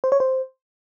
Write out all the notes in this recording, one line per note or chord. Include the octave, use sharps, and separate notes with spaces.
C5
C#5
C5